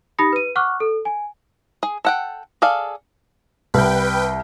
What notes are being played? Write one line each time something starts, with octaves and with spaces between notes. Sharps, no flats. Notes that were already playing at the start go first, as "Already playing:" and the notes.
D#4 G4 B5 D#6 A#6 C#7
B4 D#7
F#5 C#6 D6 F6 F#6
A4
G#5
G#4
A4 F#5 G5
G#4 A4 D5 F5
C2 B4 G5